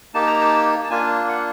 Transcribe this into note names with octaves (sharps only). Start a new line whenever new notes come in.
A#3 D#4 G4 A5
A#5
A5
A5
A#3 D4 F4 G#5
F#5